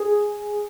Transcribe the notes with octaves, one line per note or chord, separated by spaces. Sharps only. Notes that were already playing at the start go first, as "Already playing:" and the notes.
Already playing: G#4